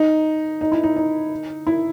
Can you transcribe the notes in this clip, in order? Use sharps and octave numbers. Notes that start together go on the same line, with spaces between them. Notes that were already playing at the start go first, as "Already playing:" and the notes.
Already playing: D#4
D#4
E4
D#4
D#4
E4